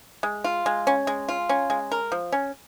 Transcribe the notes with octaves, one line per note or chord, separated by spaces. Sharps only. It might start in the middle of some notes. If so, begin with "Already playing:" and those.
G#3
F4
G#3
C#4
G#3
F4
C#4
G#3
A#4
F3
C#4